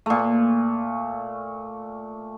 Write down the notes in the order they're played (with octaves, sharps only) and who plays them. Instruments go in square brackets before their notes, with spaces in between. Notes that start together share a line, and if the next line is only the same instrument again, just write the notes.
[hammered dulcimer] A#2 A3